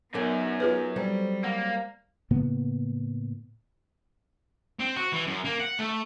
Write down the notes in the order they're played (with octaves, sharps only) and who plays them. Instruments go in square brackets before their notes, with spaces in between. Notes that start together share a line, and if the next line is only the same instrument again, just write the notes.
[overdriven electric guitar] F#2 C#4 [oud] F#3 A#4 D5 [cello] B3 D#4
[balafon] F4 G#4 B4
[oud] F#3 C4 A4 [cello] G3
[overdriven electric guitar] A#3 [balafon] F#5
[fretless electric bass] A2 C#3 A#3 B3
[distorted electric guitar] C4
F#4
E3
F#2
A#3
F#5
A3